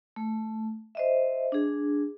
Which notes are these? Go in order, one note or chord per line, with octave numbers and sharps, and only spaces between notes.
A3
C5 D#5 E5
D4 G#4